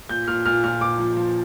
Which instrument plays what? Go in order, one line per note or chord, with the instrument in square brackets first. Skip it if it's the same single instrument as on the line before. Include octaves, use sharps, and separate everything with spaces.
[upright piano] A#2 G6
A#2 F6
A#2 F6
A#2 F6
A#2 D6
F3
F3